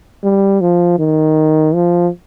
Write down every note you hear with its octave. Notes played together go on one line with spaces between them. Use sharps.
G3
F3
D#3
F3